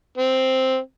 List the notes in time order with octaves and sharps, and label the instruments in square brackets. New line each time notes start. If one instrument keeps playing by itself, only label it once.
[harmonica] C4